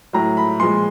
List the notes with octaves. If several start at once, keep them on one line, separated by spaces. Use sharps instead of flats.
A2 F#3 A#5
B5
A#2 F3 G#3 C6